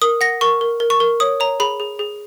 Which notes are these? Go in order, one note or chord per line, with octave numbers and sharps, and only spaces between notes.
A#4 D#6
F#5 A#6
A#4 C#6
A#4
A#4
C#6
A#4
C#5 D#6
C#5 A#5
G#4 B5
G#4
G#4